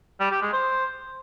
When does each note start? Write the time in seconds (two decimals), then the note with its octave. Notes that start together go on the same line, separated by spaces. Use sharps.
0.20 G3
0.31 G4
0.42 G#3
0.53 C5